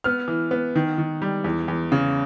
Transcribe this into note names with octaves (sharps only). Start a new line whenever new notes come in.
B3 F6
E3
B3
D#3
D#3
G3
E2
E2
C#3